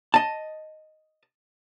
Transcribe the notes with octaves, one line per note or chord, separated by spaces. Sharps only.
D#5 A5